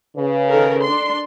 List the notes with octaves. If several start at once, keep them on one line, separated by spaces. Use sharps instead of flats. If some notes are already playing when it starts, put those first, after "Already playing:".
C#3 B4
D#3 A4 A#4
D4 C6